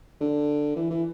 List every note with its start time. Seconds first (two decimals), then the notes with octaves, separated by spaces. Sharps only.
0.21 D3
0.76 E3
0.90 E3